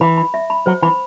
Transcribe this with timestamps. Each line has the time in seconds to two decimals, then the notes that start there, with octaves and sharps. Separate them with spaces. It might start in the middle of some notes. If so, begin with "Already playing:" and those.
0.01 E3 B5
0.17 B5
0.34 E5
0.50 B5
0.66 F#3 C5
0.82 E3 B5